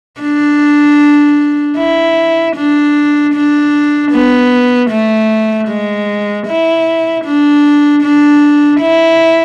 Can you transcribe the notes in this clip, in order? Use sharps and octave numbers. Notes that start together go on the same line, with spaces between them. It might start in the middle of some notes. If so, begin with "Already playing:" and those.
D4
E4
D4
D4
B3
A3
G#3
E4
D4
D4
E4